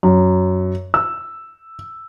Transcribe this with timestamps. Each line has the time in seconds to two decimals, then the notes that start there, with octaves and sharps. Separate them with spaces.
0.03 F#2
0.94 E6